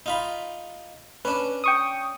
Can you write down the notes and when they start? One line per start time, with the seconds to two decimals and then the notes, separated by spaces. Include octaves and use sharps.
0.06 D#4 F4 B5
1.25 C#4 D4 B4
1.64 G5 C#6 D#6